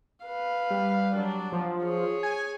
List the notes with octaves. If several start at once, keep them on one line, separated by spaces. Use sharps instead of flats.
B4 F5
G3
F#3 D4
F3
G#4 C#5
G#5